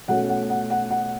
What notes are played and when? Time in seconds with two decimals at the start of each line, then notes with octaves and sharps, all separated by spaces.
0.08 B2 A3 C#4 F#5
0.29 F#5
0.50 F#5
0.70 F#5
0.90 F#5